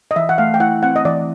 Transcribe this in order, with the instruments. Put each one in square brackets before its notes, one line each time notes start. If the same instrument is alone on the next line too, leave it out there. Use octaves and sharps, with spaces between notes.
[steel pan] D#5
[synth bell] E3 [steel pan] E5
[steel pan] F#5
[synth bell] A3 [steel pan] F5
[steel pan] G5
[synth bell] E4 [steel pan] F#5
[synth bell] C4 [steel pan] F#5
[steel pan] D#5
[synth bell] E3 [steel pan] D5